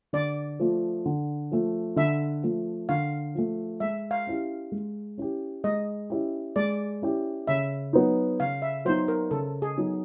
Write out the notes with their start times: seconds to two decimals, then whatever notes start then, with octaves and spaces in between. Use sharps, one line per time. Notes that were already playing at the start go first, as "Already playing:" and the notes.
0.13 D3 D5
0.60 F3 A3
1.06 D3
1.52 F3 A3
1.96 D3 E5
2.43 F3 A3
2.89 D3 F5
3.35 F3 A3
3.80 G#3 E5
4.11 F5
4.27 C#4 E4 G4
4.72 G#3
5.18 C#4 E4 G4
5.64 G#3 D#5
6.10 C#4 E4 G4
6.56 G#3 D5
7.02 C#4 E4 G4
7.47 C#3 E5
7.93 F#3 B3 D#4
8.40 C#3 F5
8.62 E5
8.85 F#3 B3 D#4 C5
9.08 A#4
9.31 C#3 A4
9.62 G#4
9.77 F#3 B3 D#4